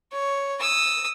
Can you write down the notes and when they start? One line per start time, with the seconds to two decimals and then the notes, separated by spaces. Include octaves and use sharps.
0.12 C#5
0.60 D#6 E6